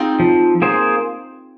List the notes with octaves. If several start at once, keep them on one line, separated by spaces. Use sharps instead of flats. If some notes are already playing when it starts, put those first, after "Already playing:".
Already playing: G#3 C4 D#4 F4
F3
A#3 G#4 C5